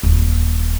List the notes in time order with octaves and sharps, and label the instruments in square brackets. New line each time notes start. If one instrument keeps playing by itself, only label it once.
[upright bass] D#1